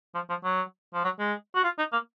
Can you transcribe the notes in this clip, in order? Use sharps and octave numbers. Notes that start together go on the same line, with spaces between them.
F3
F3
F#3
F3
F#3
G#3
F#4
F4
D#4
A#3